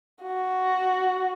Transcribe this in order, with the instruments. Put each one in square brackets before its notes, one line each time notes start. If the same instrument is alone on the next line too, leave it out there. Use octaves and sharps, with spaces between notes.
[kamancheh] F#4